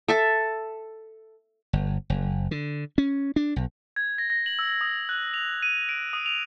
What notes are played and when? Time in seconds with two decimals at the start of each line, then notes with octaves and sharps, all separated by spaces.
0.08 A4 E5 A5
1.73 G1
2.10 F#1
2.51 D3
2.98 C#4
3.36 D4
3.56 B1
3.96 G#6
4.18 A#6
4.30 A#6
4.46 F#7
4.59 E6
4.81 D#6
5.09 F#6
5.34 F7
5.63 D#7
5.89 D7
6.13 D#6
6.26 F7